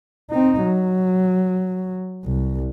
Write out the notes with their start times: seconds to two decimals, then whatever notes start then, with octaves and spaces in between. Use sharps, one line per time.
0.30 C4 D#4
0.63 F#3
2.25 C2